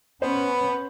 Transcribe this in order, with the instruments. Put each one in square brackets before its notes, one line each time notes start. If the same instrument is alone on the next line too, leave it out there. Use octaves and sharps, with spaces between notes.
[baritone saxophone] B3 [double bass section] C#4 [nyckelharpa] B4 B5 [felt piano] C5